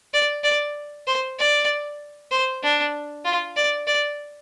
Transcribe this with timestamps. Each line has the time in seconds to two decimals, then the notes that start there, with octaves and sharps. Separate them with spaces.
0.14 D5
0.44 D5
1.07 C5
1.39 D5
2.31 C5
2.63 D4
3.25 F4
3.56 D5
3.87 D5